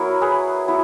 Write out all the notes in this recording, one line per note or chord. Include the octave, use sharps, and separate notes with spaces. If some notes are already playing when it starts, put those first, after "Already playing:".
Already playing: F#3 B3 E4 A#4 C#5
G#4 B4
F#3 B3 E4